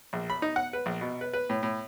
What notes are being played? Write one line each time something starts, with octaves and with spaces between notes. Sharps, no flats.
A#1
B5
D#4
F#5
B4
A#1
B2
B4
B4
A2
A2